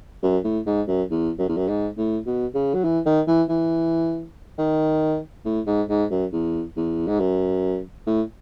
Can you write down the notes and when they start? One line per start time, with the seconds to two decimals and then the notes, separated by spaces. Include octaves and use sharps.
0.23 F#2
0.44 A2
0.66 G#2
0.88 F#2
1.10 E2
1.39 F#2
1.48 E2
1.57 F#2
1.68 G#2
1.97 A2
2.26 B2
2.54 C#3
2.74 F#3
2.84 E3
3.06 D#3
3.27 E3
3.49 E3
4.58 D#3
5.45 A2
5.67 G#2
5.89 G#2
6.10 F#2
6.32 E2
6.76 E2
7.07 G#2
7.20 F#2
8.07 A2